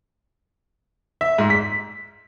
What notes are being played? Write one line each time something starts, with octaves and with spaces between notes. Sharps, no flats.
E5
G#2
B6